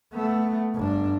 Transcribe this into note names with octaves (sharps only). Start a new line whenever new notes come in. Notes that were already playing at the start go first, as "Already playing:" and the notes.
A3 B3
G1 D4